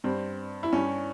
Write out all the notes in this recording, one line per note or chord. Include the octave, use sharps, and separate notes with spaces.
G2 G3 C4
E4
G2 G3 C#4